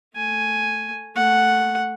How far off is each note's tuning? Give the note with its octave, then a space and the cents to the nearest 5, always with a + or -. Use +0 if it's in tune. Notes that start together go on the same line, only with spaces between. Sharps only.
A3 +0 G#5 +0
A3 +0 F#5 +0